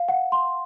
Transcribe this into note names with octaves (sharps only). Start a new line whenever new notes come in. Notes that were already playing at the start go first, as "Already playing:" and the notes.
Already playing: F5
F#5
C6